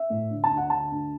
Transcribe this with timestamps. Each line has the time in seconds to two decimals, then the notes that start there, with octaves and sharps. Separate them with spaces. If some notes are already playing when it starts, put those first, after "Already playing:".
Already playing: E5
0.10 A2
0.31 D3
0.44 A5
0.51 D2
0.57 F#5
0.70 D3 A5
0.92 D2